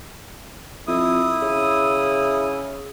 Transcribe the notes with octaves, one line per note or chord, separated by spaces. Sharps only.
F2 E4 D#6
C#3